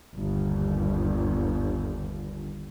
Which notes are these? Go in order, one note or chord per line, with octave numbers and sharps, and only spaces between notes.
G1 D#2